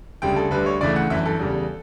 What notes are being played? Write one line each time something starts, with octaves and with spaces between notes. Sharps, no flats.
D2 C#3 G3 G5
A4
D2 D3 G3 B4
C#5
D2 C#3 E3 A3 D5
F#5
G1 F#2 E3 E5
A4
E2 C#3 G3